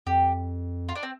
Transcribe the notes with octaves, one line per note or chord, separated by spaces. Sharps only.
F2 G4
F4
D4
C4